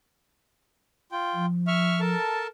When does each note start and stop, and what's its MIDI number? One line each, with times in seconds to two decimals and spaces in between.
1.12 1.46 65
1.12 1.46 79
1.34 2.15 53
1.67 2.00 76
1.67 2.00 85
1.67 2.00 89
2.01 2.47 69
2.01 2.47 70
2.01 2.47 81